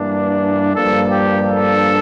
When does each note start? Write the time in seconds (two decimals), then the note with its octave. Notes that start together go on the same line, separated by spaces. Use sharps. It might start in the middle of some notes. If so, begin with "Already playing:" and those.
Already playing: G2 E3 A#3 D4
0.74 G2 F3 A#3 D4 A4
1.11 G4
1.47 A4